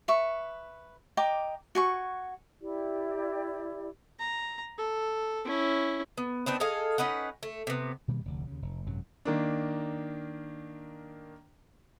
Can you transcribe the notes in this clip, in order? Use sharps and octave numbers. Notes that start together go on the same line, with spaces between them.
B4 E5 C#6
D#5 G5 A#5 D6
F#4 G#5 C#6
E4 G4 D5
A#5
A4
C#4 E4
B3
B3 C4 D4 D#4
G#4 A4 D#5 F5
C#4 D#4 B4 F#5
A3
C3 B3
B2 D#3 G3 A#3
F1 D2
D#2 C#3
F1
G#1 F#2 C3 F#3
D#3 A#3 D4